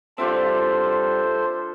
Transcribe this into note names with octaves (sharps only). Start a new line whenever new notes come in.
G3 C4 D4 F4 A4 C5 E5